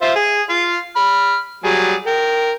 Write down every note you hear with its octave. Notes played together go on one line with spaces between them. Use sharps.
F4 C5 E5
G#4
F4 F5
B5 F6
F#3 G3 G#4
A#4 G5